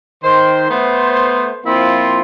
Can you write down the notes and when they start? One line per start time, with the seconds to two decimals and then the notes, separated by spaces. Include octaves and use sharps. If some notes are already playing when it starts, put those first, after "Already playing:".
0.23 D#3 C5
0.70 A3 B3 C5
1.66 F3 A#3 C4 E4 F4